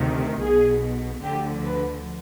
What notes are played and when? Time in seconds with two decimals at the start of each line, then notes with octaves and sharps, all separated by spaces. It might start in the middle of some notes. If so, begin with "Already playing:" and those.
Already playing: D2 C3 D#3
0.42 B1 B2 G#4
1.23 D2 D3 F3 G4
1.65 B4